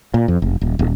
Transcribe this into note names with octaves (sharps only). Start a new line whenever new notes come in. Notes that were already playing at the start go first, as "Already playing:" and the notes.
A#2
F2
F1
D#1
D#1